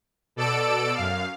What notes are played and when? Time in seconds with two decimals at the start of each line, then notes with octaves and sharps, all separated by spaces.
0.36 B2 A4 D5 E6 D7
0.94 F#2 F5